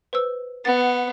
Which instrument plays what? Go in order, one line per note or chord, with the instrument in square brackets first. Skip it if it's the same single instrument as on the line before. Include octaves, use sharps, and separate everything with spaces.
[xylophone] B4 C5 E6
[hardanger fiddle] B3 [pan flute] F#5 [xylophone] A6